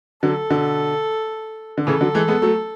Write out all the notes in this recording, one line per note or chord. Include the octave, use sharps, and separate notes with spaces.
D3 F#3 A4
B2 D3
D3
C#3 E3 A4
D3 F#3
E3 G#3
G#3 B3
F#3 A3